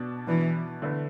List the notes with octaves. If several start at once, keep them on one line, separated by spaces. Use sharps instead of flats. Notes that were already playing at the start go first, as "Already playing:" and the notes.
Already playing: B2 B3 D4
B2 E3 B3 D4
D3 A3 E4 B4